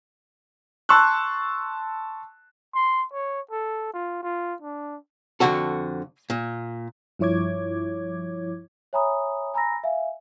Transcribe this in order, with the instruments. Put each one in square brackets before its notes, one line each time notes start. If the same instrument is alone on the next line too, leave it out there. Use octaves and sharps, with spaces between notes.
[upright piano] A5 C6 C#6 E6 F#6
[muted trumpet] C6
C#5
A4
F4
F4
D4
[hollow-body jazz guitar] F2 A#2 D3 F#4 A4
A#2
[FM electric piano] G2 F3 E4 C#5 D6 G#6
[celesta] C#5 E5 G#5 A#5 B5 D#6
G#5 A#5 B5 E6 A#6
E5 F5 G#5